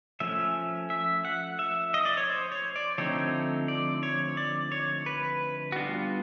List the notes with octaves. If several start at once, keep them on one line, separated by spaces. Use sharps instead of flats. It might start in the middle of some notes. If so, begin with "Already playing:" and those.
F3 A3 C#4 E5
E5
F#5
E5
D#5
D5
C#5
C5
C#5
D5
D3 F3 A3 C4 D#4 C#5
D5
C#5
D5
C#5
B4
F#4
G3 B3 D4 F4